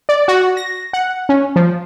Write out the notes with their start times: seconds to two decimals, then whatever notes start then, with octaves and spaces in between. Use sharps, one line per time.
0.09 D5
0.28 F#4
0.57 A#6
0.93 F#5
1.29 C#4
1.56 F3